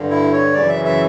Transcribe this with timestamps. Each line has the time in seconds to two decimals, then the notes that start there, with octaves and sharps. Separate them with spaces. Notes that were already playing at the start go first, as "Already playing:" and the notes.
Already playing: G2 D3
0.10 E4
0.32 C#5
0.54 F#2 C#3 E3 D5
0.69 E5
0.85 E5